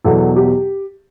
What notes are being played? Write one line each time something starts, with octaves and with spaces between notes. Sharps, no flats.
E2 B2 F#3 A4
G4